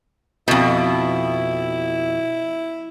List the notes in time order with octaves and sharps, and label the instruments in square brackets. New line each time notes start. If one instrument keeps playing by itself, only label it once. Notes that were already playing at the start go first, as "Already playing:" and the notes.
[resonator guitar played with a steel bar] F2 B2 [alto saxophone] E4